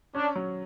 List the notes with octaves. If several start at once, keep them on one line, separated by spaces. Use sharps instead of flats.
C#4 D4
F#3